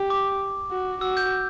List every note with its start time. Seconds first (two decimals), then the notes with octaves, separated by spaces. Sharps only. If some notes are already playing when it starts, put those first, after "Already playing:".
Already playing: G4
0.10 D6
0.71 F#4
1.01 F#4 E6
1.17 G6